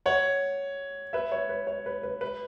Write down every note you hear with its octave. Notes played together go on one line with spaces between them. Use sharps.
C#5 F#5
B4 E5
C#5
B4
C#5
B4
B4
B4